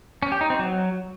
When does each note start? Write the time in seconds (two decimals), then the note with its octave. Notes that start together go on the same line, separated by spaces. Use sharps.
0.22 C#4
0.32 G4
0.41 D#4
0.50 C4
0.59 F#3